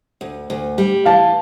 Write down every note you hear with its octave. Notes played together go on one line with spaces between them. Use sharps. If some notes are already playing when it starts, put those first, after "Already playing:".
D2
D2
G3
E3 F5 A5